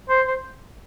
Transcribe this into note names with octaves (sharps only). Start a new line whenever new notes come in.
C5
C5